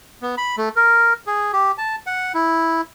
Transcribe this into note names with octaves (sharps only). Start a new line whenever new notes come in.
B3
B5
A3
A#4
G#4
G4
A5
F#5
E4